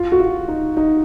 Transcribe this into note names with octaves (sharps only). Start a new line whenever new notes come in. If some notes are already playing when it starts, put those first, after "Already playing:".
Already playing: F4
F#4
F4
D#4
D#4